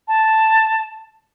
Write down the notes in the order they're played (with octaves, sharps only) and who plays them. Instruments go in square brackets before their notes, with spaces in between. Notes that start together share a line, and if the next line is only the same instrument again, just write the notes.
[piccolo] A5